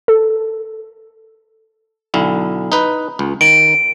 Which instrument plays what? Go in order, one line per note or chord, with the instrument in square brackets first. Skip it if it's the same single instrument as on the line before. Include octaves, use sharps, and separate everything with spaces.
[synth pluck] A4
[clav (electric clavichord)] B1 D3 E4
D#4 B4
C#2
[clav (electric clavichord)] D#3 [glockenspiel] D7